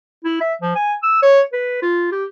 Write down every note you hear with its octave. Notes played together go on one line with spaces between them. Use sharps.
E4
E5
F3
G#5
E6
C#5
B4
F4
G4